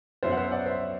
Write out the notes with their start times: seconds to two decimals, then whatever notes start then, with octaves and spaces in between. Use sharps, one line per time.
0.23 F#2 F#3 B3 C5 E5
0.31 F#5
0.37 C5 E5
0.52 D5 F#5
0.66 C5 E5